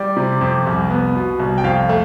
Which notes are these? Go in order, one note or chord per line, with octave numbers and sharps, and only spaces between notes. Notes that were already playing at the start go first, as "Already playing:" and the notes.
Already playing: G3 D5
C3
F2
C2
B3
B2
C2
G5
F2 F5
A3